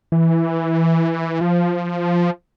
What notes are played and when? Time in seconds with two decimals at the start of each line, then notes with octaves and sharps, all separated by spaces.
0.12 E3
1.41 F3